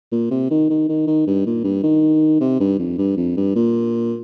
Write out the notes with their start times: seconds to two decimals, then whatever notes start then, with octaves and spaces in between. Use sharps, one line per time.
0.12 A#2
0.31 C3
0.51 D#3
0.70 D#3
0.89 D#3
1.07 D#3
1.27 G2
1.46 A#2
1.64 G2
1.83 D#3
2.41 C3
2.61 G2
2.79 F2
2.98 G2
3.17 F2
3.37 G2
3.56 A#2